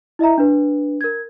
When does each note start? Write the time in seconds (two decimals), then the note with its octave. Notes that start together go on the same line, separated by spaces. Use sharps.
0.19 E4 D#5 E5 A#5
0.38 D4 B4
1.01 A#4 G#6